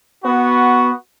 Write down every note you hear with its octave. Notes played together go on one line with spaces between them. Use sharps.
B3 F#4